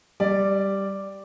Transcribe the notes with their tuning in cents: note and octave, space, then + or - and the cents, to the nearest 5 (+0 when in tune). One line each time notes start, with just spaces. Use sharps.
G3 +0 D5 +0